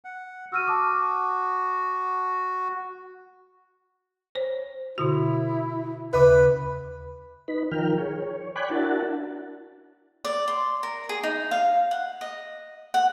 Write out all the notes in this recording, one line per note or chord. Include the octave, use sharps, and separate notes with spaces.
F#5
F#4 E6 F6 D#7
A5 D6 D#6
C5 C#5
B2 D3 E4 F#4
D#2 C#3 B4
D#4 B4 B5
D#3 F3 A#4 G5 F6
G#4 C#5
C#5
C#5 D5 G5 G#5 B5 F#6
D4 E4 F#4 A#4 F#5 A5
D5
C6
A#4
G#4
D#4
F5
F#5
D#5
F#5